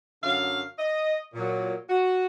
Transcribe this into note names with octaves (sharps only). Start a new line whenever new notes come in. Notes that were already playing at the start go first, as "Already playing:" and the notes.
F#2 D3 F#3 F5
D#5
A#2 F#3
F#4